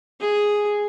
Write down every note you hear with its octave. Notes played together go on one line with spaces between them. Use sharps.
G#4